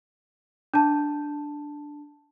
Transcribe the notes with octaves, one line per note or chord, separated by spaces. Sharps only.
D4 A5